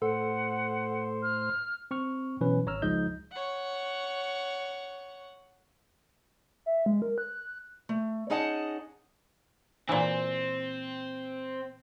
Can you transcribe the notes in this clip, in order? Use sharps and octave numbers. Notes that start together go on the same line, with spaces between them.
A2 A4 C5 F#5
F6
C4 C#6 F6
B2 E3 F#3 C#4 B4
G#1 C#5 A#5 E6 F6
C#2 F3 G#3 D#4 D#5 G6
C#5 F#5
E5
G#3
A#4
F#6
A3
C#4 D#4 G#4 D#5 F#5 A5
A#2 E3 C4